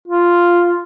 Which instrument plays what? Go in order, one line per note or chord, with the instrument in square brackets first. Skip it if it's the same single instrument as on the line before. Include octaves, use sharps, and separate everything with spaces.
[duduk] F4